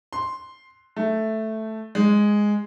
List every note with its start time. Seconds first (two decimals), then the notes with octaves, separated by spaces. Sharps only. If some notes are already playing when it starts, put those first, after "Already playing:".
0.13 C6
0.96 A3
1.95 G#3